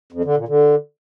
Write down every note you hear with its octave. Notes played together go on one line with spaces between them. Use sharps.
F2
D3
A#2
D3